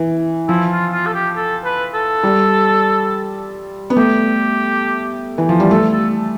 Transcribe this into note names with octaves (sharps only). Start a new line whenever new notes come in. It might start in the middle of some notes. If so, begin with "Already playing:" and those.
Already playing: E3
F3 E4
F4
F4
A4
G4
A4
B4
A4
G3
B3
A3 G4
E3
F3
G3
A3 A4
A4